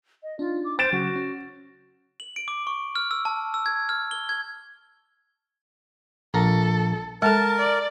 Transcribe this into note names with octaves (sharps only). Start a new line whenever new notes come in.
D#5
D4 D#4 F4
D6
C5 A6 D7 E7
C#3 F#3 F#4
C#4
F#7
D7
D6
C#6
F6
E6
A5
E6
G#6
F6
G7
G#6
A#1 A4 A#4 A#5
G#3 A4 A#4 F#5 A5
D5